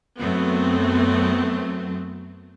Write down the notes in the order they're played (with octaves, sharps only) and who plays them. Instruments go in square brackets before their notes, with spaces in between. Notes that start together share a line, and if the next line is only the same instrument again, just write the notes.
[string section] F#2 F#3 A3 B3 C4